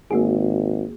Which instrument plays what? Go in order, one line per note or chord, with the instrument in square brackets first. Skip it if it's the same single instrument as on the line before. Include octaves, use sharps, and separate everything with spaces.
[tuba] G#1 [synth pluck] A#3 F#4 G#4